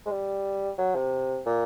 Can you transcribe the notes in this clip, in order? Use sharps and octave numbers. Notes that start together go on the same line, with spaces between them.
G#3
G3
F#3
C3
A#2